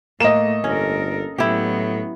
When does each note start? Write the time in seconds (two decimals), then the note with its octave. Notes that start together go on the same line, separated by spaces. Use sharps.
0.20 A2 A3 A#3 D#5 E7
0.64 G1 C#4 A4 A#4
1.38 A2 F#3 B3 E4 G4